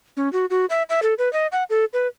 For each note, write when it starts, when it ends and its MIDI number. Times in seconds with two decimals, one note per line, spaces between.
0.17 0.31 61
0.33 0.46 66
0.50 0.66 66
0.70 0.83 76
0.90 1.00 76
1.03 1.14 69
1.18 1.31 71
1.33 1.47 75
1.52 1.64 78
1.70 1.85 69
1.93 2.07 71